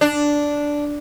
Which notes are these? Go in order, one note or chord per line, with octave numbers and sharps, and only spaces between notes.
D4